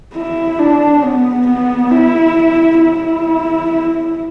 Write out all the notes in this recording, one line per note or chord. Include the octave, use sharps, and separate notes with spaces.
E4
D4
B3
B3
E4
E4